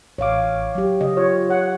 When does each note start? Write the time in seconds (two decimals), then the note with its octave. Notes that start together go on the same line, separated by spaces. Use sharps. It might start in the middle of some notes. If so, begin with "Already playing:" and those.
0.18 A1 C#5 F5 D6
0.75 F#3 G4
1.01 C#3 D#5
1.17 F4 C#5
1.49 C#5 F#5